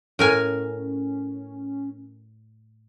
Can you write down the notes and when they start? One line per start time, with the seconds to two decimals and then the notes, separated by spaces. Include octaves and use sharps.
0.19 A2 C#4 A#4 G#5